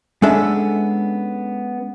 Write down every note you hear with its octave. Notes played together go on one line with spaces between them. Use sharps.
G#3 B3 C#4 D4 A4 E5